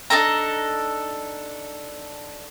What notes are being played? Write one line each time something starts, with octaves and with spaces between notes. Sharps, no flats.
D4 D#4 A4 A#5